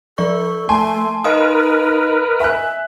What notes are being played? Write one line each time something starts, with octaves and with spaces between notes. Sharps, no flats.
F3 A4 D5 C#6
A3 G#5 A5 C6
D#4 A#4 B4 D#5 F5 D#6
E5 G#5 F#6